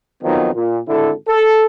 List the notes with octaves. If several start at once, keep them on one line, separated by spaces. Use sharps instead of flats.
F2 D#3 F3 F#3 B3 D#4
A#2
G#1 D3 E4 A4
A4